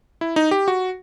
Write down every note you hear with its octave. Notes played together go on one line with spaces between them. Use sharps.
E4
D#4
G4
F#4